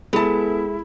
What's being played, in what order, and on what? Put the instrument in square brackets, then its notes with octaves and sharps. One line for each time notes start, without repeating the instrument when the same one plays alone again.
[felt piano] G#3 [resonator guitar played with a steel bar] B3 A5 [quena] E4 [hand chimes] A4